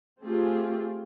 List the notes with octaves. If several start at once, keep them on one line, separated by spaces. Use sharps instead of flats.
A3 C4 F4 G4 G#4